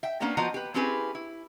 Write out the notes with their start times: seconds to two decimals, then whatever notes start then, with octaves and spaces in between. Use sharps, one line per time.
0.03 E5 G5
0.20 A#3 B3 C#4 D4 G4
0.37 F3 B3 F#4 C5 D#5 A#5
0.54 G4 B4
0.74 C4 C#4 E4 G4 G#4 B4
1.15 E4